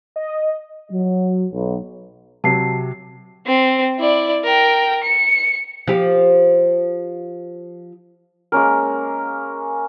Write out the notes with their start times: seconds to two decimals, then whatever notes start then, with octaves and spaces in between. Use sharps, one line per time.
0.16 D#5
0.91 F#3
1.51 B1
2.44 C3 F#3 A5 C7
3.47 C4
3.99 E4 D5
4.44 A#4 G5
5.03 C#7
5.87 F3 G4
8.52 G#3 A#3 C#4 A#4